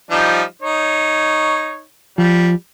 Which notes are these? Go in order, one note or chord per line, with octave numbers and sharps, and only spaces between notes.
F3 G3 D#4
D#4 C#5
F3 G3